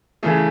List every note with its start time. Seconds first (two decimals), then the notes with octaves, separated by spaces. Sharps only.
0.23 C#3 E3 A3 G#4